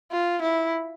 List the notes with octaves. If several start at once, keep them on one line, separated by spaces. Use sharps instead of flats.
F4
E4